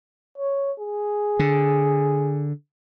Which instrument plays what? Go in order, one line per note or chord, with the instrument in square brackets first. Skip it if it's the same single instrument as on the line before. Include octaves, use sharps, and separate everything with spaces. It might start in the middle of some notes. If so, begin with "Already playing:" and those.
[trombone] C#5
G#4
[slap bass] D3